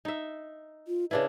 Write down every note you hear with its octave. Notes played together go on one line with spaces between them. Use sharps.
D#4 E5
F4
C#3 D4 E4 B4